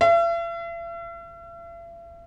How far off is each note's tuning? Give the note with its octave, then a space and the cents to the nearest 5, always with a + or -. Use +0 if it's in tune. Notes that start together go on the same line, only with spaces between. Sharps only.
E5 +45